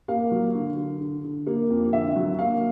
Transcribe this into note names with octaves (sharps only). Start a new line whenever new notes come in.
A#3 F5
F#3
D3
D3
D3
D3
A#3
F2
D3 E5
F#3
A#3 F5